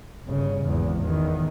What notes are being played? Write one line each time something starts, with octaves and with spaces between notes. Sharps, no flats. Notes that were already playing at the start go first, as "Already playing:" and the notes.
G1 C#3
G#1 E2
E2 D#3